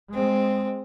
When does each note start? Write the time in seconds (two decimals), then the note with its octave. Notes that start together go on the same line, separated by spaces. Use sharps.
0.14 G#3 C4